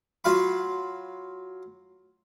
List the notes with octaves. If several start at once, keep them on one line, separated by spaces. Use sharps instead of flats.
F#3 F4 F5 B5